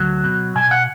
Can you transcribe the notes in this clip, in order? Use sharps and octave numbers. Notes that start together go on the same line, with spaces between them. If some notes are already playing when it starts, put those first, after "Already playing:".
Already playing: D2 F#3
B2
B2 G#5
F#5